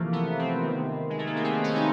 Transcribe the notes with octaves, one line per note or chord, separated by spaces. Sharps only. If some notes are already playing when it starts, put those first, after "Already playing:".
Already playing: C3 E3 F3 A3 A#3
B3
C4
C3 D#3
G#3
A3
A#3
B3
C4
C#4
D#4